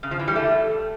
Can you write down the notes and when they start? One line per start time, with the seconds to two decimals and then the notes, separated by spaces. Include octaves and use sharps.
0.03 C#3
0.11 F3
0.19 E3
0.28 G3
0.36 A3